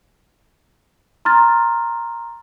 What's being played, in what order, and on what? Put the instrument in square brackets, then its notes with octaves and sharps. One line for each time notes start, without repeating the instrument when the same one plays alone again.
[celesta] A#5 C6 F6 A6